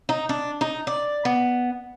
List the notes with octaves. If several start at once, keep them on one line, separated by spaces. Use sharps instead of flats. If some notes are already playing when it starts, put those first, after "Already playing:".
D#4
D4
D#4
D5
B3